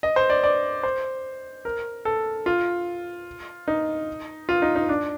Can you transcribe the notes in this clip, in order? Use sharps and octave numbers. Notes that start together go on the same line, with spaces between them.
D#5
C5
D5
D5
C5
A#4
A4
F4
D#4
F4
D#4
D#4
D4